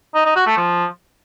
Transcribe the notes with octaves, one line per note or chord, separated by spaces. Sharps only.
D#4
D#4
F#4
A3
F3